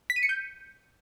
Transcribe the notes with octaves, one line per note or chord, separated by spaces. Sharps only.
B6
D#7
C#7
G6